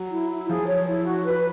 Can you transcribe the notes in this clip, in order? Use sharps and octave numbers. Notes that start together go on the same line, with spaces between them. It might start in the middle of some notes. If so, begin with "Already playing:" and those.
Already playing: F#3
E4
E4
F3 G#4
C#5
E4
F#4
B4